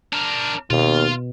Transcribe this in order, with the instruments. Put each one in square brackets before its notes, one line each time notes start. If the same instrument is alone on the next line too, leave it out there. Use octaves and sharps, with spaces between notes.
[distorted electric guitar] D4 A#4
[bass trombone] D#2 [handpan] B2 [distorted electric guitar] F4